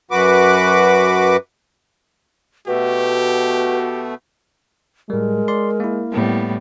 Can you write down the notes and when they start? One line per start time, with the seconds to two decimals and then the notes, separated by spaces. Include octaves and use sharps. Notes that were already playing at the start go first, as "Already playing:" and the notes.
0.11 F#2 F#4 B4 D6
2.67 B2 A3 F#4 G4 B4
5.10 A2 G3 G#3 A#4
5.48 D5 C6
5.80 A#3 E4
6.12 A2 G3 B3